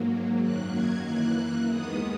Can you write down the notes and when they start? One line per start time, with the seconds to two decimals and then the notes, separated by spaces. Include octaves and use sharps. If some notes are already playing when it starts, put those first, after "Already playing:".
Already playing: G#2 F#3 A#3
0.41 F#2 D#3 F#3 A#3 F#6
0.73 G#6
1.05 F#2 E3 A#3 F#6
1.69 D#2 D#3 G#3 B3 D#6